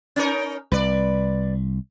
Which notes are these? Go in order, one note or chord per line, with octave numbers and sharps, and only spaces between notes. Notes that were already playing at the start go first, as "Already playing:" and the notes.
C#4 D#4 A#4
C2 B4 D5